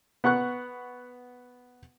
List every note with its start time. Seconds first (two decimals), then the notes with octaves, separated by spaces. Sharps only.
0.24 B3 F#5 C#6 F#6